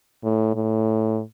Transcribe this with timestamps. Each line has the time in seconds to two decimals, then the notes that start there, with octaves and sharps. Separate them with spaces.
0.24 A2
0.55 A2